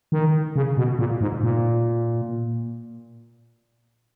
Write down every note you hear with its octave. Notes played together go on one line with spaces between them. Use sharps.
D#3
C#3
B2
A#2
G#2
A#2